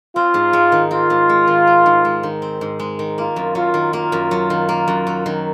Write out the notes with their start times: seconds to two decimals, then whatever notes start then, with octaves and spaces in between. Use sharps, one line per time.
0.15 C4 F4
0.34 G#2
0.53 G#3
0.72 D#3
0.91 C4 F4
1.10 G#2
1.29 G#3
1.47 D#3
1.67 C4
1.86 G#2
2.05 G#3
2.23 D#3
2.42 C4
2.61 G#2
2.79 G#3
2.99 D#3
3.18 A#3 F4
3.36 F#2
3.55 F#3 F4
3.74 D#3
3.93 A#3 F4
4.12 F#2
4.31 F#3
4.50 D#3
4.69 A#3
4.88 F#2
5.07 F#3
5.26 D#3